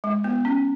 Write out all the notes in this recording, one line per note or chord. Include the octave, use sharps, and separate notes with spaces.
G#3
B3
C#4